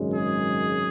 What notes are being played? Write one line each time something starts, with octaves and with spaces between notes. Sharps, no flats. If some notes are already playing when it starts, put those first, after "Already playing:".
Already playing: G#1 F#2 C#3 G#3
G#4